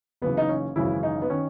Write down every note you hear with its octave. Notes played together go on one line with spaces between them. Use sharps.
F#1 F#2 C#3 E3 B3
D#4
C#4
G#1 F#2 C#3 E3 E4
D#4
B3
D#3 C#4